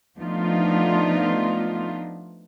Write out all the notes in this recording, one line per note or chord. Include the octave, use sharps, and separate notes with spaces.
F3 A3 B3 D4 D#4 F4